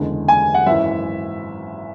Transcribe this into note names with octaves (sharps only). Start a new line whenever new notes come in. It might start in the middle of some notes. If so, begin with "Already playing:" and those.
Already playing: F#1 E2 D3 G#3
G#5
F#5
G#1 F#2 E3 E5